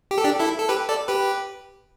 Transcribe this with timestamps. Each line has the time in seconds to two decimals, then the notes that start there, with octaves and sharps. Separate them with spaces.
0.11 G4
0.18 A4
0.24 D4 G4
0.39 E4 A4
0.59 A4
0.69 G4 B4
0.89 A4 D5
1.08 G4 B4